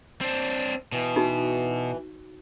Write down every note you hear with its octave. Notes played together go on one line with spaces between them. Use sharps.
C4 D4
B2 E3
D#4 F#4